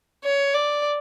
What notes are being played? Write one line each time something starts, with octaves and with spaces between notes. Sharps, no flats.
C#5
D5